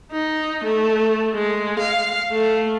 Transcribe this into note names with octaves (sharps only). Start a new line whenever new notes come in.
D#4
A3
G#3
F5
A3